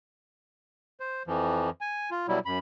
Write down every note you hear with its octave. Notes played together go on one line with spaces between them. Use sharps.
C5
F2 E3 F3
G#5
F4
B2 F#3 G3 E4
F#2 B5